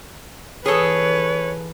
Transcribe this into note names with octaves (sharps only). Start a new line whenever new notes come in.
E3 G#4 A4 B4 C#5